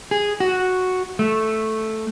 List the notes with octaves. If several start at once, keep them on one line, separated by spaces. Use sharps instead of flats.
G#4
F#4
A3